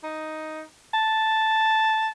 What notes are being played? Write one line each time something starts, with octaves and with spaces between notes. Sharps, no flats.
D#4
A5